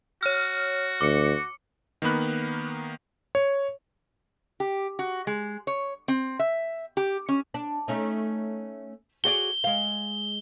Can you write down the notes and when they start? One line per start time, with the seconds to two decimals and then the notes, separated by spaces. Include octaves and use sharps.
0.23 F#4 C#5 F6
1.01 D2 D6 C#7
2.02 D#3 A#3 B3 B5 F#6
3.35 C#5
4.60 G4
4.99 F#4
5.27 G#3
5.67 C#5
6.08 C4
6.39 E5
6.97 G4
7.29 C#4
7.54 D4
7.88 A3 C#4 D#4
9.24 F#4 G#4 D5 G7
9.64 G#3 F5